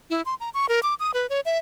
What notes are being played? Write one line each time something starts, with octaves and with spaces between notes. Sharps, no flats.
E4
C6
A#5
C#6
A#4
D6
D#6
B4
C#5
E5